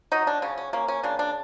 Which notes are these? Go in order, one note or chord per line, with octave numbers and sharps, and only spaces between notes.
F#3 D#4
D4
C#3 C#4
C#4
A#3 C#4
C#4
C#3 D4
D4